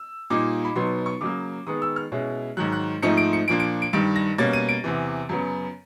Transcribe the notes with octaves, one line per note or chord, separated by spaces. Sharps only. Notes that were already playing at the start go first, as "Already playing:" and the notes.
Already playing: E6
A#2 G3 A#3 D#4 D6
B5
B2 F#3 B3 D#4 C6
C#6
C#3 F#3 A#3 D6
D#3 G#3 B3 D#6
E6
F6
B2 G#3 C#4 E4
G#2 D#3 F#3 F#6
F#6
G#2 F3 A3 C4 D#4 C#7
D7
C#7
A#2 F3 A#3 D4 D7
D7
D7
G2 D#3 G3 D7
A#6
B2 G3 A#3 C#4 A6
D#7
D7
E2 C3 E3
F#2 C#3 F#3 B3